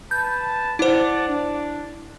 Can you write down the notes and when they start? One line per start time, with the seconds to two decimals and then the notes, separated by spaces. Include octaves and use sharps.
0.11 B4 A5 G6
0.79 E4 C5 D5 F#5 A5
1.28 D4